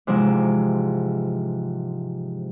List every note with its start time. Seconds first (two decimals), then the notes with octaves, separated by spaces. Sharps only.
0.07 G#2 C3 E3 F3 G#3